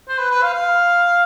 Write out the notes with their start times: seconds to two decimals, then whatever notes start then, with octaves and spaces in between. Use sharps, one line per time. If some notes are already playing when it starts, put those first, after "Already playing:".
0.09 C5
0.19 B4
0.31 B4
0.42 F5
0.53 F5